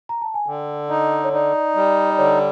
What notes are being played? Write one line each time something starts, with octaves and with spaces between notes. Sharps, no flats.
A#5
A5
G#5
D3 G5
D#4 D#5
C#5
D#4 D5
G3
D5
D3 C#5